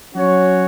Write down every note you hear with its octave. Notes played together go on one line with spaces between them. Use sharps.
F#3 C#4 F#4 C#5